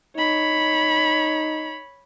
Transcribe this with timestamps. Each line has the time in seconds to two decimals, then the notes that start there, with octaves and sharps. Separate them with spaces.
0.17 D#4 C#5 B5